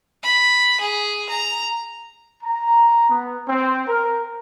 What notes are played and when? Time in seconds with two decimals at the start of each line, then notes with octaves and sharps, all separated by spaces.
0.23 B5
0.81 G#4
1.29 A#5
2.43 A#5
3.10 B3
3.48 C4
3.87 A#4